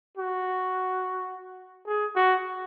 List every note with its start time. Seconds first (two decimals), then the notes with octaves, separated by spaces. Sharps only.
0.17 F#4
1.87 G#4
2.16 F#4